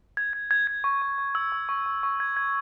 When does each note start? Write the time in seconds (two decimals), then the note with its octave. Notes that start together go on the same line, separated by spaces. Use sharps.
0.17 G#6
0.33 G#6
0.51 G#6
0.67 G#6
0.84 C#6
1.02 C#6
1.18 C#6
1.35 E6
1.52 C#6
1.69 C#6
1.86 C#6
2.03 C#6
2.20 G#6
2.37 G#6